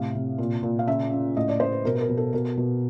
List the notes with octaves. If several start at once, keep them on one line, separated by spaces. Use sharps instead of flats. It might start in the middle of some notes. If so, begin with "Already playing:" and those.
Already playing: A2 C3 F5
C3
A#2
A#2
F5
C#3 E5
C#3
A2 D#5
D5
A2 C5
B4
B2 A#4
B4
A#4
B2
A4
B2 A#4
B2